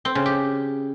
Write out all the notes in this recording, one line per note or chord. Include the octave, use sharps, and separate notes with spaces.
C4
C#3
G4